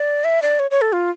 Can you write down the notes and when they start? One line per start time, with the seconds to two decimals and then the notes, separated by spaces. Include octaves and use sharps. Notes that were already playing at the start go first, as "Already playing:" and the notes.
Already playing: D5
0.24 E5
0.42 D5
0.59 C#5
0.71 C#5
0.81 A4
0.93 F4